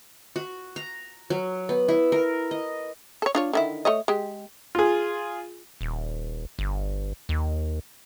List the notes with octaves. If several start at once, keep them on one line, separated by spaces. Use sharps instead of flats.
F#4
A#5
F#3
B3
E4
A#4
D#5
A4 C#5
D4 F4 C#5
D3 D#3 E4
A3 C#5 D#5
G#3 G4
F4 G#4
D#1
G1
D#2